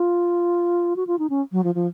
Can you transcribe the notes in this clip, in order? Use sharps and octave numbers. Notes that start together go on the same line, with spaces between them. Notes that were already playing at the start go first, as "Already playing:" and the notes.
Already playing: F4
F#4
F4
D#4
C#4
F#3
F3
F3